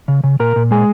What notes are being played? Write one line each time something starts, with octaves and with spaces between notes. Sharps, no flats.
C#3
C#3
A#2 A#4 A#5
A#2
G#3 G#4 G#5